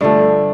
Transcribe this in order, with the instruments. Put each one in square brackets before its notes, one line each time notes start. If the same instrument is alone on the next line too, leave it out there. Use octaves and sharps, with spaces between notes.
[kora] G2 D3 F3 A3 [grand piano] D4